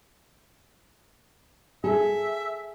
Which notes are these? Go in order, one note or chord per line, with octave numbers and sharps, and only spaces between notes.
G#4 A4 E5